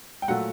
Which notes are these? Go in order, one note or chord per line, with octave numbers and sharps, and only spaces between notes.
G5
A#2 F#3 A3 F#5